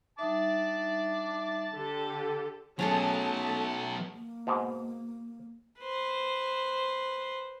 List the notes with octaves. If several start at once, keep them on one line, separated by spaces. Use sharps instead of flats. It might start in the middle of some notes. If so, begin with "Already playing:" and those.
G3 D#4 E5 A5 D6
D3 G4 A4
F#3 A3 B3 C#4 G#4 A4 A5
A#3
G#2 B2
B4 C5